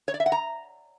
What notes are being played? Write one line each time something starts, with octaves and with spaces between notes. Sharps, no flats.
C#5
D5
E5
F#5
A#5